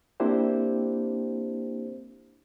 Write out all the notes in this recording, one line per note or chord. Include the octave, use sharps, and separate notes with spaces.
A#3 C4 D4 E4 G4 C5